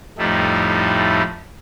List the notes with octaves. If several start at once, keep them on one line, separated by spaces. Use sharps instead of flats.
F2 A2 G3 A3 D#4 E4